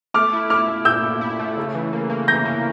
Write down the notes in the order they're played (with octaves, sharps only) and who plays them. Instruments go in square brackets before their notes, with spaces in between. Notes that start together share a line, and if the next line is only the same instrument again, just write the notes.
[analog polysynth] A3 [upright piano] D6 F6
[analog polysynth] E4
[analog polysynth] E4 [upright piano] D6 F6
[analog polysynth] A3
[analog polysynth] A#2 [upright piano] E6 G6
[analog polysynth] A3
E4
A3
C#3
E3
A#3
A#3
[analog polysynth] E3 [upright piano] G6 A#6
[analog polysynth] A#3